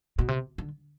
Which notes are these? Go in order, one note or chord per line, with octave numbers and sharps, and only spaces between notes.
B2
C3
D3